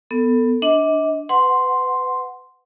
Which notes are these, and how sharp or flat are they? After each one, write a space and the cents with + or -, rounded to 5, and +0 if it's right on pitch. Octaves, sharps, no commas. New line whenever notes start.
B3 +0 A4 +20
D4 +0 D#5 +40
B4 +25 F#5 +0 C6 +0